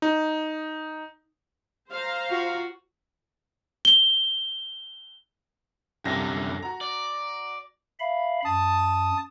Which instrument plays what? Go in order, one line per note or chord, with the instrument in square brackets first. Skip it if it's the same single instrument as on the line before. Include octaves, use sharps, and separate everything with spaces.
[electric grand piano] D#4
[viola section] C5 F5 A#5
[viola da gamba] F4 F#4
[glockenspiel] G7
[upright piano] C2 G3 A#6 [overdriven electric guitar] F#2 D3
[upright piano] F#4 A#5
[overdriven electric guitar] D5
[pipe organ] E5 F5 B5
[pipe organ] F#2 [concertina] A5 D#6